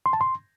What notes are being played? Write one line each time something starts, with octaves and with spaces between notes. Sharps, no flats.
C6
A5
C6